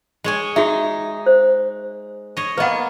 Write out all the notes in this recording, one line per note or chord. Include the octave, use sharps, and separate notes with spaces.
G#3 C#5 G#5
D#4 F#4 G#4 E5
C5
C#5 D#5
A#3 B3 B4 D#5 F#5